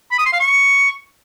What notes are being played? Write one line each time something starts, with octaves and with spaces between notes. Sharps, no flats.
B5
D#6
C6
F5
C#6